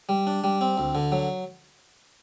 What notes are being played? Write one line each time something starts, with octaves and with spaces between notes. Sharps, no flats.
G3
D4
G3
C4
D2
D3
F#3